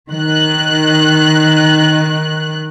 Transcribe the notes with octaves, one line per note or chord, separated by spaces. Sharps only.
D#3 F#6